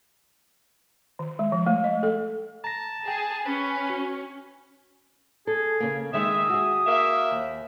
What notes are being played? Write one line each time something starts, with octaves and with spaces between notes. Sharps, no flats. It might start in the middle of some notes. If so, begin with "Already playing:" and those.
D#3
G#3
F3
A3
D#5
A4
A5 A#5 A#6
G#4 G5
C#4 B4
F#4
G#4 A4
C#3 A#3
D#3 G#3 D#4 E5 D#6
F#4 G#4
A#3 E5
D#2